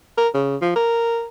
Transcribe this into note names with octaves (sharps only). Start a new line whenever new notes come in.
A#4
C#3
F3
A#4